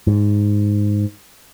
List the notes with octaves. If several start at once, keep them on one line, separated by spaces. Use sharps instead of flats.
G#2